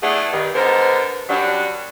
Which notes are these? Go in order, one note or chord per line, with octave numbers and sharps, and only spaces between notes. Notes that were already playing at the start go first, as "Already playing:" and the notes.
A3 B3 D4 E4 G#4
G2 D#3
D3 G#3 B3 A#4 C5
F#2 F#3 G3 D4